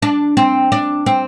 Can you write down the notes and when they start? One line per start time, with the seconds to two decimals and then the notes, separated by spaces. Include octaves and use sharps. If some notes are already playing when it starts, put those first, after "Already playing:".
0.02 D4
0.37 C4
0.72 D4
1.06 C4